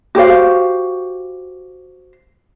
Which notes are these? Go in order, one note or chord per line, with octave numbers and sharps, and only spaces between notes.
F#4 G4 C5 F5